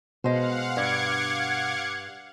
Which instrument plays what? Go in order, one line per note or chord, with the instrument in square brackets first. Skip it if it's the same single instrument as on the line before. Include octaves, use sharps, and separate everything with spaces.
[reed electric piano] B2 [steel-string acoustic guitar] G#3 C5 [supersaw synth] F5 F#5
[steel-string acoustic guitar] G2 [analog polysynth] D6 G#6 C#7